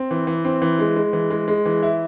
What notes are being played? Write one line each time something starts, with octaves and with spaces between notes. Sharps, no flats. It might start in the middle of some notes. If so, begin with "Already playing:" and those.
Already playing: C4
E3
E3
C4
E3
G#3
G#3
E3
G#3
G#3
E3
E4